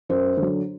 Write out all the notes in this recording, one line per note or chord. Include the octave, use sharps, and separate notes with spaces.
F#2 C5
D3 F#3